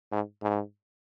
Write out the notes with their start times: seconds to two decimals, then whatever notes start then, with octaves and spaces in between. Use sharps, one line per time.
0.12 G#2
0.42 G#2